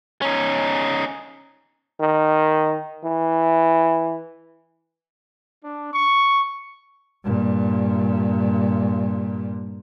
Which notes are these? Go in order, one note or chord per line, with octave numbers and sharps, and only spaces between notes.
C#4 D#4
D#3
E3
D4
C#6
G2 A#2